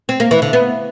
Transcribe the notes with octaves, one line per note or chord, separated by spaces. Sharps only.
C4
A#3
E3
D3
B3